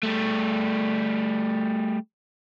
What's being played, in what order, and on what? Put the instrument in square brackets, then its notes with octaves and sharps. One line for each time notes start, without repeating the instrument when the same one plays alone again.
[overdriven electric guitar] G3 A3